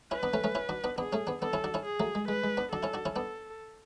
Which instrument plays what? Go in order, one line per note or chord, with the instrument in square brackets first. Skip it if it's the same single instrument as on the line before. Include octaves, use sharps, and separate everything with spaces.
[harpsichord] C#4 E4 [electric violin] B4
[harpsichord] B3 D4
A3 C#4
A3 C#4
C#4 E4
D4 F#4
B3 D4
[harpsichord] B3 D4 [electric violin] G#4
[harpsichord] A3 C#4
B3 D4
[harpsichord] B3 D4 [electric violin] A4
[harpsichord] C#4 E4
D4 F#4
C#4 E4
[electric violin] G#4
[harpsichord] F#3 A3
G#3
[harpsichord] G#3 [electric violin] B4
[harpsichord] G#3
B3 D4
[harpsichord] D4 F#4 [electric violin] A4
[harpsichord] C#4 E4
D4 F#4
C#4 E4
[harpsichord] B3 D4 [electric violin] A4